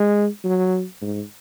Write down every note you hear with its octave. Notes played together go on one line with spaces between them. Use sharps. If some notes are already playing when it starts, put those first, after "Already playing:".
Already playing: G#3
F#3
G#2